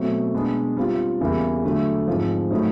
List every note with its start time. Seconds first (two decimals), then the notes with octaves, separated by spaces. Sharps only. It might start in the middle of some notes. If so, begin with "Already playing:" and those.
Already playing: B2 F#3 A3 C4
0.33 B2 G#3 B3 D4
0.77 G3 C4 F4
1.21 E2 C#3 E3 G3 A#3
1.64 D3 F#3 A3
2.08 G#2 F3 G#3 C4
2.51 A2 F#3 A3 C4 D#4